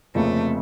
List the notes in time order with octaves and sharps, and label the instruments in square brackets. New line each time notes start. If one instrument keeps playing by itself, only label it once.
[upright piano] F1 F2 C#3 F3 A#3 [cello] A3